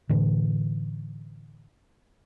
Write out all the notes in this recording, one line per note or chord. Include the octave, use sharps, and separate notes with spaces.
A2 D3 E3